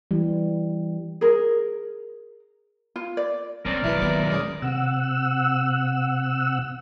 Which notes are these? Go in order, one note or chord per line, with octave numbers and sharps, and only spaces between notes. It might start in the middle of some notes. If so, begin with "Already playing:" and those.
E3 G3
G#4 A#4
F4
D5
F#3 C4 C#4 A#4 D5
D#2 F#3 E4 F4 B4
D#3 B3 D6
G#3 C#4 D#4
C3 F#5 E6